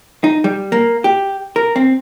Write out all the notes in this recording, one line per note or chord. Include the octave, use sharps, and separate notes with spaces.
D#4
G3
A#3
G4
A#4
C4